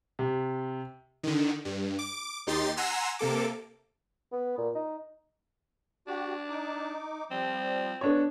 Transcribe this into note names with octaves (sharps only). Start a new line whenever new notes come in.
C3
D3 D#3
G2
D6
D#2 D#4 G4 C6 A6
F#5 G#5 A#5 C6 E6
C3 A#3 A4 D6
B3
A#2
D#4
D4 F#4 G4
D#4 D6
F3 G3 C4
B3 D4 C#5